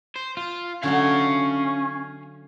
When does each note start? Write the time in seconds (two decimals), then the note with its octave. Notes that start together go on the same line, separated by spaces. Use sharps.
0.16 C5
0.37 F4
0.83 D3 F#3 A3 C#4 F5 G#5